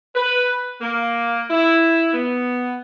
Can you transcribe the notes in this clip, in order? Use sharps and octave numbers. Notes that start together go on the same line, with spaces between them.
B4
A#3
E4
B3